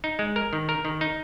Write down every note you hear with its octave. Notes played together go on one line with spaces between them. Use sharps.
D#4
G#3
A#4
D#3
A#4
D#3
D#4